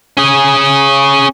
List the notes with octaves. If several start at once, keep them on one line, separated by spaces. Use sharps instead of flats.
C#4 G#4